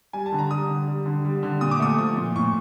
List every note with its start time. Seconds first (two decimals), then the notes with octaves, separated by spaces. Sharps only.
0.13 G3 G#5
0.26 A5
0.32 D3
0.39 A#5
0.51 G3 D#6
0.69 D3
0.88 G3
1.06 D3
1.25 G3
1.43 D3
1.61 A#2 D#6
1.71 D6
1.80 A3 D#6
1.98 F3 D#6
2.17 A#2
2.36 A2 C#6